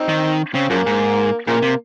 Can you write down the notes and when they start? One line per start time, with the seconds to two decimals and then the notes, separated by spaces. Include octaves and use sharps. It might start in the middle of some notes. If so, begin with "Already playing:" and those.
Already playing: C4 D#4
0.09 D#3
0.54 C#3 C4
0.70 F#2 C#3 F3 A#3
0.86 G#2
1.47 A#2 C#3 F3 A#3
1.62 C3